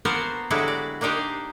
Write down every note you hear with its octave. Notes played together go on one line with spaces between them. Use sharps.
A#3 B3 F#4 A#4 C5 A5
D3 F#3 G#3 E4 F#4 G4
D5
A#3 D4 D#4 G4 A#4 C5